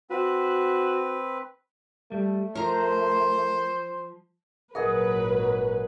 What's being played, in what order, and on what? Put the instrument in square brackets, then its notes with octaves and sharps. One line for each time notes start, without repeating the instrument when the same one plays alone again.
[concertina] C4 B4 [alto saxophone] F#4
[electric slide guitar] G3 [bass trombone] A3
[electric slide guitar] F3 [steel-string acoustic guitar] A#4 A#5 [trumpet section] C5
[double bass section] G#1 A#2 F#3 [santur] G#4 D#5 F#5 [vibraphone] A#4 [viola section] B4